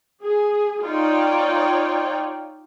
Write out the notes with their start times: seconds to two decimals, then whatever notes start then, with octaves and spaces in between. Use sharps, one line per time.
0.22 G#4
0.83 D#4 F4 C#5 D5 G5